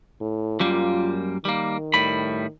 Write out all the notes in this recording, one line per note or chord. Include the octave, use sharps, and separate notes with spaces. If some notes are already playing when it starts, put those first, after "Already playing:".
A2
F#2 G3 A#3 F4
D#3 G3 A#3
A2 G3 B5